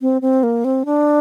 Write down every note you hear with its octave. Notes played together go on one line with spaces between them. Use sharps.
C4
C4
A#3
C4
D4